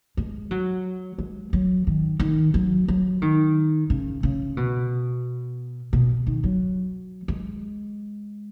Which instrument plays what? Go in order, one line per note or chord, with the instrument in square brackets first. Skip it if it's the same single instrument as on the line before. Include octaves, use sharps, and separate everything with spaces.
[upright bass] G#3
F#3
G#3
F#3
D#3
D#3
F#3
F#3
D#3
C#3
C#3
B2
B2
D#3
F#3
G#3